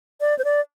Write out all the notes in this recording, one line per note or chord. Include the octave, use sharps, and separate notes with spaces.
D5
C5
D5